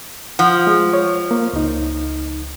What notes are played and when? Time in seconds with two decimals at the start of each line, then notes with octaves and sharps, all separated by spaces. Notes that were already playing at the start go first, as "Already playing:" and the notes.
0.39 F3 F#5
0.67 G#3
0.93 C#5
1.31 A#3
1.53 C#2 D#4